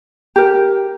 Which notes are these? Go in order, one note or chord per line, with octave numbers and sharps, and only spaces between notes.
G4 A#4